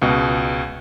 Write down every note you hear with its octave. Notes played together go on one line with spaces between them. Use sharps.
C#2 B2